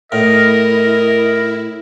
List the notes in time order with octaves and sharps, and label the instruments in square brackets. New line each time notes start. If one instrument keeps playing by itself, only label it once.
[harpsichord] A2 [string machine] E4 [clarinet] A#4 [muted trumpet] D#5